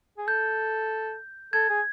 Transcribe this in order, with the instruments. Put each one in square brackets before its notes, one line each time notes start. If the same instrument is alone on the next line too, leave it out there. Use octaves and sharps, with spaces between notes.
[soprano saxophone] G#4
[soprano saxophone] A4 [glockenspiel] G6
[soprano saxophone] A4 [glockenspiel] G#6
[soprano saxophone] G#4